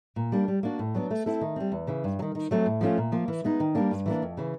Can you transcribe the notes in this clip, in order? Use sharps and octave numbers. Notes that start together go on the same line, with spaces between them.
A#2
G3 A#3 D4
G3
A#3 D4 F#4
A2
F#3 B3 D4
A3
C4 E4 A4
D#3
G3 C4
E2
C#3 E3
G2
F#3
D#3
D#3
F#3 A3 C4
A2
F3 A3 C#4 F4
A#2
F3 A#3
E3
G#3 B3 D#4
D#3
G3 A#3 D4
G2
E3 G3 A#3 D4
F2
C#3 E3